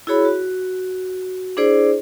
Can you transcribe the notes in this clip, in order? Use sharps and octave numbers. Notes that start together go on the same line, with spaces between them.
E4 F#4 G#4 C#5 B5
F#4
D4 E4 G#4 C5 D5